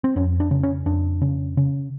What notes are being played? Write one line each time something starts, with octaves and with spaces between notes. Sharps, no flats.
C4
F2 C#4
D4
C#3
C#4
F2 D4
C#3
C#3